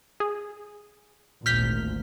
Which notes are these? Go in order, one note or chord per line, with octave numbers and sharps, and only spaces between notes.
G#4
G#1 D2 A#2 F6 G6 B6